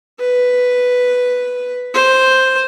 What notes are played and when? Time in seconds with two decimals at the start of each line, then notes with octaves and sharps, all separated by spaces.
0.19 B4
1.94 C5